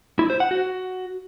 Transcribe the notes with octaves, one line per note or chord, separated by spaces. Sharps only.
E4
C5
F#5
F#4